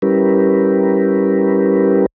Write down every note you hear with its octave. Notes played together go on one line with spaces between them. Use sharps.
G3 C#4 E4 G4 A#4 B4